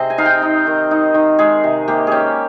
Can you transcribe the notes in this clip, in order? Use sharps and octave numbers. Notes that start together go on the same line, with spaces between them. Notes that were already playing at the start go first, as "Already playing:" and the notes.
Already playing: C3 C4 G#4 D#5
G#5
D#4 F5
G5
D#4
D#3
D#4
D#3
G#3 G#4
C3
A#3 G4
C#4 G4 G#4